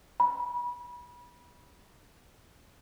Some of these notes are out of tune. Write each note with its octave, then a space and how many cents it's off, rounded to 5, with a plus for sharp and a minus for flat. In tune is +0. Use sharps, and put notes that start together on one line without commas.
B5 -25